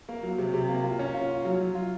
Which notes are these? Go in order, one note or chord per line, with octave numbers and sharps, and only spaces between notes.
A#3
F#3
C3
C3
A#3
F4
C#4
F4
F4
F#3
F#3
F4